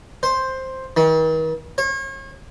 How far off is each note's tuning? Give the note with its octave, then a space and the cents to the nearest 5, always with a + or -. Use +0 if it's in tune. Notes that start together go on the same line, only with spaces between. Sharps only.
C5 +5
D#3 +45
C#5 -40